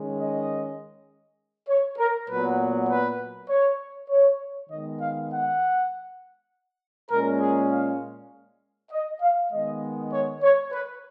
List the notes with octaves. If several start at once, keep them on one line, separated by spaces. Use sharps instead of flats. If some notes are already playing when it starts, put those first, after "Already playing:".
Already playing: D#3 G#3 C#4
D#5
C#5
A#4
A#2 F#3 B3 B4
B4
C#5
C#5
D#3 G#3 B3 D#5
F5
F#5
A#2 G#3 C#4 A#4
G#4
F5
D#5
F5
D#3 G#3 B3 D#5
C#5
C#5
B4